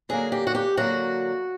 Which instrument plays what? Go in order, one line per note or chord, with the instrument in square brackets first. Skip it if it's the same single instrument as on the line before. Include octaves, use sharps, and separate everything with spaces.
[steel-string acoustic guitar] D3 F#3 A#3 G#4
G4
F#4
G4
D3 F#3 A#3 F#4